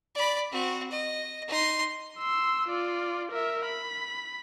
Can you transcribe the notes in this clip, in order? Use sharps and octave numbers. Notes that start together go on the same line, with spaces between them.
D5 B5
C4 F#4
D#5
D#4 C6
C6 E6
F4 D5
A#4 E5
B5